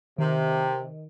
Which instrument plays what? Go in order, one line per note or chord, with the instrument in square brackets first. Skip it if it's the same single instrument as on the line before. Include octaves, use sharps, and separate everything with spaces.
[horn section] C3 [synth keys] D#3